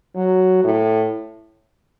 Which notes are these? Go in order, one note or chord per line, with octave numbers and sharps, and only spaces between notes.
F#3
A2